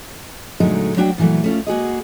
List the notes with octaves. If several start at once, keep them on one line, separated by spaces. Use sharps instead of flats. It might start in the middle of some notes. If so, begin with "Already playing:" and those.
A#2 D3 F#3 G#3 A3 D#4
F#3 A3 D4 F#4 G5
A#2 E3 F#3 A3
A3 C#4 F4
A#3 F#4 G#4 D#5